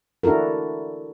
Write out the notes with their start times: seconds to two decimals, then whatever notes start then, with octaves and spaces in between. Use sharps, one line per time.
0.23 D4 E4 F#4 A4 A#4